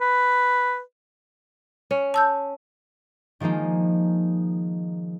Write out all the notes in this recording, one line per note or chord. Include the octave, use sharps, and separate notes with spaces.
B4
C#4
A5 E6 G6
D#3 F3 G#3 A#3 D#4